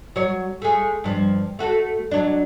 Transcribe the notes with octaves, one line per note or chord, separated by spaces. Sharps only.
F#3 C#5
G#3 A3
G2 F3
A3 F#4 A4
F#3 D4